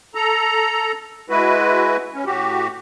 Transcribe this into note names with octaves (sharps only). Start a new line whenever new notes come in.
A4 A#5
G#3 E4 F#4 B4
C#4
A2 F#4 G4